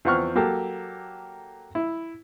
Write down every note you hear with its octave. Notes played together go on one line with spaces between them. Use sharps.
E2 F3 C4 F#5 C#6 F6
F#3 A#3 G4 A4
E4